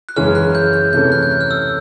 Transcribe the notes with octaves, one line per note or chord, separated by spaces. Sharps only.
F#6
F#2 C#3 E3 G#3 C#4 F6
F#6
G6
G6
C3 E3 A3 C#4 G6
F#6
G6
F#6
F6
E6